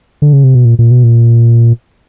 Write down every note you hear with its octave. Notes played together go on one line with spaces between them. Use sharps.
D3
C#3
C3
B2
A#2
A#2
B2
A#2